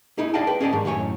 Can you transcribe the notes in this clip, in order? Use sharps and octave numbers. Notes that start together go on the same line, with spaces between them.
D#4 E4 G#4
G#4 D5 D#5 F5 G5 A5
B4 G5
C#4 G#4 D5 D#5 A5
G#2 D#3
F#2 A2 C#5 G#5